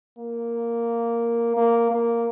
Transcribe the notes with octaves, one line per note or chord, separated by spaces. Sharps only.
A#3
A#3
A#3